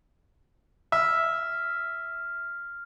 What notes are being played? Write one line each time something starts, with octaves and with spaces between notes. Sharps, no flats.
E5 F6